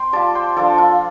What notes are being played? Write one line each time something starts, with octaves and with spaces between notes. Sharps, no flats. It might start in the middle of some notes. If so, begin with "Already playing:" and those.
Already playing: C4 G5 C6
G3 F4 A5 D6
G5 C6
F3 D4 F4 A4 D5
F4